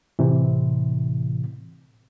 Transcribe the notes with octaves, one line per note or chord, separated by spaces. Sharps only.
A2 C3 E3